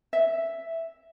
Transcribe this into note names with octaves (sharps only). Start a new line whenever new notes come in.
E5